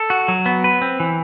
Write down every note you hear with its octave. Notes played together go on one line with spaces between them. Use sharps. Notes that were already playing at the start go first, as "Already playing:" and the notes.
Already playing: A4
F#4
F#3
B3
B4
C4
E3